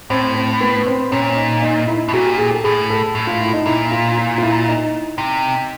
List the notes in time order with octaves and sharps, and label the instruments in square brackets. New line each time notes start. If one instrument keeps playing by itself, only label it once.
[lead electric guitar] A2 [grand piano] C4
[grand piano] C4
B3
C4
[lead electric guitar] A#2 [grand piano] C#4
[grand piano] D#4
D#4
D#4
E4
[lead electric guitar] B2
[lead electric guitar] A#2 [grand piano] F#4
[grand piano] G4
G#4
A4
[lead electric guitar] A2 [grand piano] G#4
[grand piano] A4
[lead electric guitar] A2
[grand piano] F4
E4
D#4
[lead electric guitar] A#2 [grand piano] E4
[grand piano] F4
F4
F4
E4
D#4
[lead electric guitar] C3